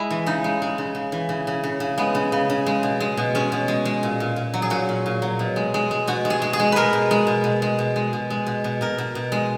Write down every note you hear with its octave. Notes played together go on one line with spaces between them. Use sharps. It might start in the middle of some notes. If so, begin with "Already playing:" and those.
Already playing: G#3 E4
E3
C#3 D#4
G#3
G#3
C#3
C#3
E3
C#3
C#3
C#3
C#3
G#3 B3
C#3
C#3
C#3
G#3
B2
G#3
B2
G#3 C#4
B2
G#3
G#3
A#2
A#2
A#2
F#3
G#4
A#2 F#4
A#2
A#2
F#3
B2
G#3
G#3
G#3
B2 F#4
G#3
G#4
G#3
G#4
G#3
G#3 A#4 B4
B2
G#3
B2
B2
G#3
B2
G#3
B2
G#3
B2
B2
B2 A#4
B2
B2
G#3